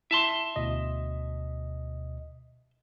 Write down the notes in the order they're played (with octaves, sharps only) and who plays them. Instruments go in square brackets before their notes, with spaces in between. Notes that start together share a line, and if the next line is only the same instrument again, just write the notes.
[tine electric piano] E4 [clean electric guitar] E5 A5 C6
[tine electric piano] D2 B2 D#5